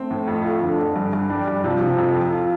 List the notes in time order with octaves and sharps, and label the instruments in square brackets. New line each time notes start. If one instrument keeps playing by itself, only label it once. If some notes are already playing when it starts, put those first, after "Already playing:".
Already playing: [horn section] A3 [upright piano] C4
[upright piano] A2
F2
F4
[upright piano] F2 [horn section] D3
[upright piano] F2
G2
G2
[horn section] G3 [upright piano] D4
[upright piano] G2
[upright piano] C3 [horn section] F3
[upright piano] C3
F2
F2
F4